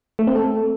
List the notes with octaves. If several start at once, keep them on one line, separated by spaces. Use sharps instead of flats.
A3
C4
A4